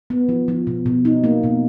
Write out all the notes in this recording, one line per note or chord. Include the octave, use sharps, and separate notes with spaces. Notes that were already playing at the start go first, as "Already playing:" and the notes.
B3
F3
F3
B2
B2
D#4
A#3
B2